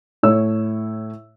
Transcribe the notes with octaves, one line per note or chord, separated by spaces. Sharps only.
A2 A3 C#5 E6